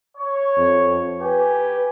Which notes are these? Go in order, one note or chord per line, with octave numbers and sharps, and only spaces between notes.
C#5
F2
G4 B4 G#5